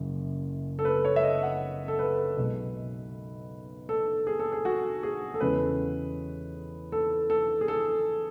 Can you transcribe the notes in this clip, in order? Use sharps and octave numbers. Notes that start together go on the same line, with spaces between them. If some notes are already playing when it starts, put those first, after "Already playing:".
Already playing: F#1 F#2 C#3
A4
B4
C#5
E5
D#5
F#5
A4
B4
B1 B2 G#3
A4
G#4
A4
G#4
F#4
G#4
A4
E2 C#3 G#3 C#4 B4
A4
A4
G#4
A4